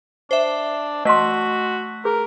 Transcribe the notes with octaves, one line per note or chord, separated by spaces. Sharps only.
D4 C5 E5
A3 F#4 D#5 C6 B6
G#4 A#4